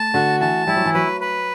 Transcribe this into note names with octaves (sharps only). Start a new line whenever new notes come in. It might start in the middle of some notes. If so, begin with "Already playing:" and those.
Already playing: A3 A5
D3 F#4
E3 A5
G3 E4
F#3
E3
F#3 B4
B4